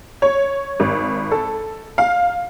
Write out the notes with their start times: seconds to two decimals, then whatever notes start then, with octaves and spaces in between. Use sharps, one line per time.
0.22 C#5
0.80 G#1
1.32 A4
1.98 F5